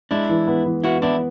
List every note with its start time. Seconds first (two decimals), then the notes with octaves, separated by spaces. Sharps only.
0.11 G#3 D4 E4
0.29 E3
0.48 B3
0.66 E3
0.84 B3 E4 F#4
1.02 B3 D4 E4